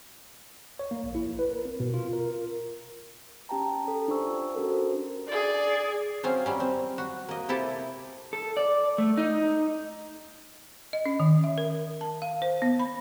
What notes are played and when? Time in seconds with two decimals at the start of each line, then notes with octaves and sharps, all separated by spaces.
0.79 C#5
0.91 A#3
1.03 A#1
1.15 E4
1.27 A1
1.39 B4
1.51 A#4
1.65 C4
1.80 B2
1.94 F4
2.13 A#4
3.49 C#4 G4 G5 A5 A#5
3.88 A4
4.08 D4 F4 G4 C5 C#6 E6
4.55 C#4 D4 F#4 A4 A#4
4.68 C5
5.27 G#4 D5
6.23 F#3 C4 C#4 F4 C5
6.46 F#3 G3 C#4
6.60 C4
6.98 F#4
7.28 A#3 D#5
7.49 C3 E4 G4 A4 A5
8.33 A4
8.57 D5
8.98 A3
9.17 D#4
10.93 D#5
11.06 C#4
11.20 D#3
11.44 E5
11.58 A#4
12.01 A5
12.22 F5
12.42 C5
12.62 B3
12.79 B5